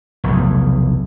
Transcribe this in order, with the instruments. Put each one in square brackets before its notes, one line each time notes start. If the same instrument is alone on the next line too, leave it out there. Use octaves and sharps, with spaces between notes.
[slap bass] F1 B1 E2